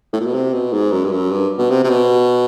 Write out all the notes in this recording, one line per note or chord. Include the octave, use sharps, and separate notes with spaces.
A2
A#2
B2
C3
B2
G#2
F#2
G2
F#2
G2
B2
C3
C3
B2